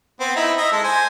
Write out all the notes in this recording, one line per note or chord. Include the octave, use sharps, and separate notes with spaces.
B3 C4
D#4 E4
D#5 E5
G#3 A4
C5 G#5